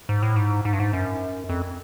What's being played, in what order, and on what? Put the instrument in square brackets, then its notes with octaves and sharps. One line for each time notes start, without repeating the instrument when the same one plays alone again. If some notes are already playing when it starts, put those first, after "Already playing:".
[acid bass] G#2
A2
G#2
G#2
G2
G#2
F#2
F2